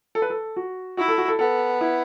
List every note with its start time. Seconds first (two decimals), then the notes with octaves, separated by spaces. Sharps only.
0.15 A4
0.22 B4
0.30 A4
0.56 F#4
0.97 E4 F#4
1.08 A4
1.18 F#4
1.28 A4
1.39 B3 A4
1.81 E4